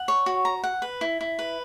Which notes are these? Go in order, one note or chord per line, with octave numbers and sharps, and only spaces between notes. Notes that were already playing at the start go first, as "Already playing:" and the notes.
Already playing: F#5
C#5
F#4
A#5
F#5
B4
E4
E4
B4